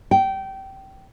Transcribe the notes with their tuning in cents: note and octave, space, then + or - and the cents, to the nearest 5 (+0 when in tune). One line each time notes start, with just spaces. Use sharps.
G5 -20